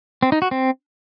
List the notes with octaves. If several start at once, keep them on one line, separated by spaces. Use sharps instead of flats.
C4
D#4
F#4
C4